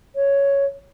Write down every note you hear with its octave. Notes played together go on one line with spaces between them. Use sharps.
C#5